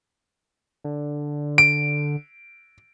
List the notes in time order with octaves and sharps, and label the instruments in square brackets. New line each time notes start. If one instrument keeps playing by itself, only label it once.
[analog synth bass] D3
[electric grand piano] D7